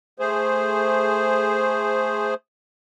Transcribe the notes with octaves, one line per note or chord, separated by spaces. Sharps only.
A3 G#4 C5